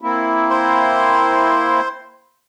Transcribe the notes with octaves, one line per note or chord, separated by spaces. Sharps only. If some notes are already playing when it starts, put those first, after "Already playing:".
A#3 C4 E4
C5 C6